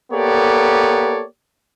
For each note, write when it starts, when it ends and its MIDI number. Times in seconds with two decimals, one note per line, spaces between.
0.12 1.24 58
0.12 1.24 59
0.12 1.24 67
0.12 1.24 69
0.12 1.24 73
0.12 1.24 74